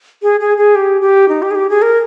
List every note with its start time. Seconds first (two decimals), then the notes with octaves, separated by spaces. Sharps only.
0.22 G#4
0.40 G#4
0.57 G#4
0.75 G4
1.01 G4
1.29 D#4
1.42 G4
1.51 G#4
1.55 G4
1.70 G#4
1.82 A#4